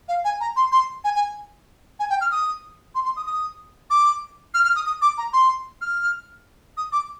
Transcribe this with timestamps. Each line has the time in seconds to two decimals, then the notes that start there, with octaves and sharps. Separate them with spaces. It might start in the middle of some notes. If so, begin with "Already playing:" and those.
0.09 F5
0.25 G#5
0.41 A#5
0.56 C6
0.72 C6
1.04 G#5
1.15 G#5
2.00 G#5
2.10 G5
2.21 F6
2.32 D#6
2.95 C6
3.05 C6
3.16 D#6
3.27 D#6
3.90 D6
4.54 F6
4.65 F6
4.76 D#6
4.86 D#6
5.02 D6
5.18 A#5
5.33 C6
5.81 F6
6.77 D#6
6.92 D6